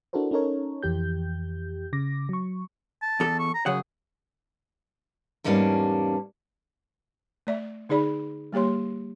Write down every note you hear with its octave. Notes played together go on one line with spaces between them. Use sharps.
D4 E4 F#4 A4 A#4 C5
C#4 D#4 A4 A#4 C#5
F2 E3 G4 G6
C#3 D6 A#6
F#3 C#6
A5
E2 A4
C#6
A#5
F#2 C#3 G#4 F#5
E2 G#2 G3 A#3 C#4 D4
A3 D5 E5
D3 D#4 G#4 D5 B5
G3 A#3 G4 C#5 C6